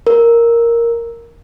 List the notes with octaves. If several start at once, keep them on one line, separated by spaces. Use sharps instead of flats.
A#4